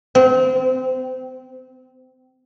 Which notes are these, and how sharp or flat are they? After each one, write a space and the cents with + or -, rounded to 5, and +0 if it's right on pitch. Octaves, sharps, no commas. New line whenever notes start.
C4 -25